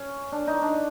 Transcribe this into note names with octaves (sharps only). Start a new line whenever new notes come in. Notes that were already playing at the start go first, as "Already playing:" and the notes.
Already playing: C#4
D4
D#4
D4